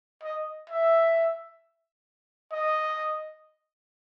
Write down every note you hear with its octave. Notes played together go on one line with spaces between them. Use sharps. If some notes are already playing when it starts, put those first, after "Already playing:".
D#5
E5
D#5